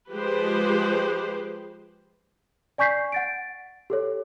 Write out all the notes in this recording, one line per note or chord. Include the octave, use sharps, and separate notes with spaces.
F3 G#3 G4 B4 C5
D5 G#5 C#6 G6 B6 C7
F#5 A6 D7
G4 A4 C#5